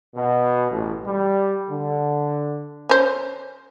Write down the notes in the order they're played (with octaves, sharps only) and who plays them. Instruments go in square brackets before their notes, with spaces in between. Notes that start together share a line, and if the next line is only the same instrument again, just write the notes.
[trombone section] B2
A1
G3
D3
[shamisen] C#4 C5